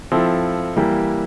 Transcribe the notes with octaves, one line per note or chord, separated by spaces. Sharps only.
F3 C4 E4 A4
E3 G3 A#3 E4 G4